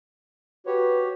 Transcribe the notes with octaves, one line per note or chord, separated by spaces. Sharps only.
F#4 G4 B4 C#5